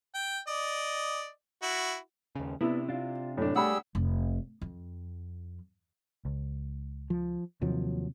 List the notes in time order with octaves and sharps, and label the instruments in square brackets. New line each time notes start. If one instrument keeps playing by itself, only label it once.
[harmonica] G5
D5 D#5
E4 F#4
[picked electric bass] D#2 C#3
[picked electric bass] C3 [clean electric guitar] B3 D4 [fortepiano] E4
[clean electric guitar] D4 F4
[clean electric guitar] F#2 [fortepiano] A2 D4
[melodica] G3 G#4 E6 [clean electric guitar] A3 [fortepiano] F#5 B5
[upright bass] F1
F2
[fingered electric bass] C#2
[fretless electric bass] F3
[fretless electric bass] D#2 F3 F#3 [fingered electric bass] C3